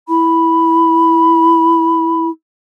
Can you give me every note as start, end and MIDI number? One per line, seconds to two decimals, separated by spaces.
0.09 2.30 64
0.09 2.28 83